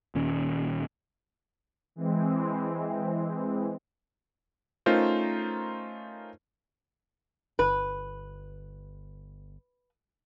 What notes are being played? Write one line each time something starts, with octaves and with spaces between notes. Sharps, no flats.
D#1 D#2 C#4
E3 G#3 C4
A3 C#4 D#4 F4 A#4 C5
G1 B4